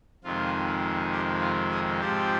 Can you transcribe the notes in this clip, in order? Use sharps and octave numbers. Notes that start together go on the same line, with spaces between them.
F2 C3 D#3 G#3 F4
G4
F4
G#4
G#2 F3 C4 G4